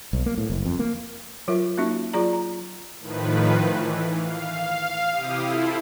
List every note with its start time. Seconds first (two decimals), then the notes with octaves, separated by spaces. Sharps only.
0.13 B1
0.26 A#3
0.38 A2
0.50 F#1
0.65 F2
0.79 A#3
1.48 F#3 F4 A#4 E5
1.78 A#3 C#4 D#4 F#4 E5
2.14 F#3 F4 G#4 D5 A#5
2.33 A#5
3.00 A2 D#3 F3 B4
3.54 E3
4.15 F5
5.11 C3 E4 G4 D#6
5.44 E4 F4 A4 C5